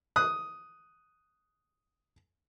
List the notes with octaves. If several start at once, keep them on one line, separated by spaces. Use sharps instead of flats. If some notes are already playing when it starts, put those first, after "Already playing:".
D#6 F#6